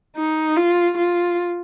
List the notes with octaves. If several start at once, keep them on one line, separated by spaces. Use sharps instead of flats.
D#4
F4
F4